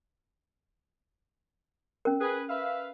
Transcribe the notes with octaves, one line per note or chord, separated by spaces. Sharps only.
C#4 A#4
G#4 B4
B4 E5 F5